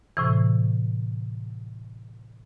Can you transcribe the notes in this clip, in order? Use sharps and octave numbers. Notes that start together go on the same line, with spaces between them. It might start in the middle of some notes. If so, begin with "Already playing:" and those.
A2 C3 E3